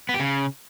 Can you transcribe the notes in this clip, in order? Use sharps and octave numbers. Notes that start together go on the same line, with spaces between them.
B3
G4
C#3